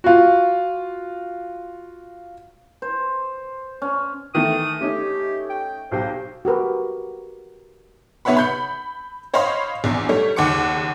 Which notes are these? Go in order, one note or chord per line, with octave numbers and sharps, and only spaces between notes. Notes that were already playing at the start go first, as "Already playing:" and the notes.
F4 F#4
C5
C#4
D#3 E3 A3 D#6
A3 C#4 D#4 G4
G5
B1 G4 C5 G5
F#4 G4 A#4 B4
F1 B3 C#5 E5 F#5 B5
B5 G6 C#7
C5 C#5 D#5 F5 B5 C6
A#1 E2 C7
G3 A3 C#5
F#1 D#2 F#5 D6 C#7